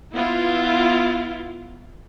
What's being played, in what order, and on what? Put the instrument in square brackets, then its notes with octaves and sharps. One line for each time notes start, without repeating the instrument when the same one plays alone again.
[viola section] B3 E4 F4